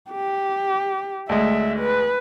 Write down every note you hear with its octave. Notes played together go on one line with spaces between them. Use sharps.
G4
D2 G#3 E5
B4